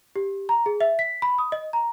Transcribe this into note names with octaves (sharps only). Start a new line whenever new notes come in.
G4
A#5
G#4
E5
B6
B5
D#6
D#5
A#5